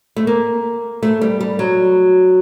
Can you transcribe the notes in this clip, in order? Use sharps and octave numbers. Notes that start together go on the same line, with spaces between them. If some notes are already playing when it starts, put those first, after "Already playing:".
A3
A#3
A3
G3
G3
F#3